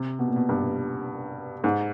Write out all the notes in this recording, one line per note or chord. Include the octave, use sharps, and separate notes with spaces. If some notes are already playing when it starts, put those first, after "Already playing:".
Already playing: C3
B2
A#2
B2
G2
G#2